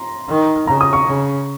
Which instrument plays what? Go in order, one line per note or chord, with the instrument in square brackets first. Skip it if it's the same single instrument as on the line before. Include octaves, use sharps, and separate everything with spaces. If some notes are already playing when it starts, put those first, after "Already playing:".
Already playing: [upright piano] A#5 C6
[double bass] D#3
[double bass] C#3 [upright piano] A#5
[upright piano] D#6
C#6
[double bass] C#3